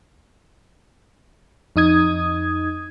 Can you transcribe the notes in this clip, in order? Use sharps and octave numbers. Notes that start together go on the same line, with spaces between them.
F2 D#4 D#6 G#6